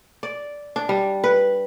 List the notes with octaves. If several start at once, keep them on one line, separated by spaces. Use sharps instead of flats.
D5
D4
G3
B4